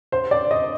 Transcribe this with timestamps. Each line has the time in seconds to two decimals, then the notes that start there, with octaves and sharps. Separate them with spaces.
0.12 C5
0.31 D5
0.51 D#5